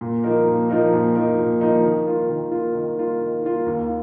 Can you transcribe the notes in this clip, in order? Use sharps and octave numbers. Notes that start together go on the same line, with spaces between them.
A#2
F3 A#3 D#4 A#4
A#2
F3 A#3 D#4 A#4
A#2
F3 A#3 D#4 A#4
A#2
F3 A#3 D#4 A#4
D#3
A#3 F4
D#3
A#3 F4
D#3
A#3 F4
D#3
A#3 F4
D#2